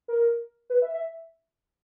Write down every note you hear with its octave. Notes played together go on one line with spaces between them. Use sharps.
A#4
B4
E5
E5